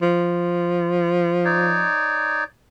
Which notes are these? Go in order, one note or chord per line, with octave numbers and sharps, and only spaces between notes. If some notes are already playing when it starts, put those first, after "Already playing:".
F3
D#4 C#5 D5